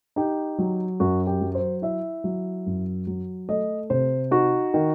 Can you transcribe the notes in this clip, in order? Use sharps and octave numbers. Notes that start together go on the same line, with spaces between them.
D#4 G4
F#3
F#2 F#4
G4
F#3
C5
E4 E5
F#3
F#2
F#3
A3 D#5
C3 C5
D#4 F#4
D#3